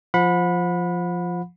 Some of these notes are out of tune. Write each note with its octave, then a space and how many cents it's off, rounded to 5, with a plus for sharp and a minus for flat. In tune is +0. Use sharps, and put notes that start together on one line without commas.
F3 +0 F#5 -40 B5 +0